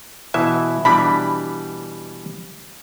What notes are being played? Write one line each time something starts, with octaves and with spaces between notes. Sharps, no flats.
B2 E3 E4 E5
B2 E3 G3 D4 B5